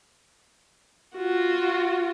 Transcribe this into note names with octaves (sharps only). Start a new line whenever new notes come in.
F4 F#4